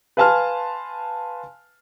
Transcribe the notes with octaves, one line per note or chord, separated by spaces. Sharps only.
B4 F5 G#5 A5 C6 F6